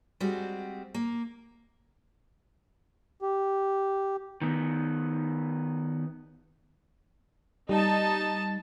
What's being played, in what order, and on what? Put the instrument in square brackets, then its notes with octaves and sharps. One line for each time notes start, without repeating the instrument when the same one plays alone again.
[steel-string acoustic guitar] G3 G#3 C4 F#4
A#3
[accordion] G4
[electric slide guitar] D#3 B3
[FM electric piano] G3 [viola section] D#4 A5